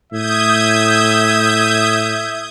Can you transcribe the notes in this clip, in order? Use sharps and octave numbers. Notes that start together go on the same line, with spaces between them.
A2 E5 D#6 G6 G#6